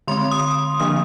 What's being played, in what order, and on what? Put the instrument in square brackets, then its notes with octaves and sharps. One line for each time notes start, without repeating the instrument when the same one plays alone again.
[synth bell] D3 G#3 C4 C6
D#6
D3 F3 A#3 D4 D#6